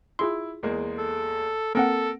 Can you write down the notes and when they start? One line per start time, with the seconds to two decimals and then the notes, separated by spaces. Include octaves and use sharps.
0.19 E4 F4 G#4 C6
0.63 E2 G#3 A#3
0.98 A4
1.75 A#3 C4 A4 A#4 F#5